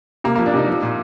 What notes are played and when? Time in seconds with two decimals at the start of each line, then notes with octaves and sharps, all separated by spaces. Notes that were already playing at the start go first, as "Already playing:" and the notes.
0.24 C3 A#3
0.35 F3 A#3
0.46 D4
0.54 C3 D#4
0.68 F3
0.82 A#2